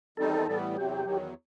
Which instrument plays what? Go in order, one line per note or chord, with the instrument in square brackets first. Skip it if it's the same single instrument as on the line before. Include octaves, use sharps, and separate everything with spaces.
[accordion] E2 D#3 G3 C4 D#4 [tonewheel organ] A4
[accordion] A2 E3 G3 B3
[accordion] E2 C3 F#3 [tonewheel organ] G4
[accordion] E2 D#3 F#3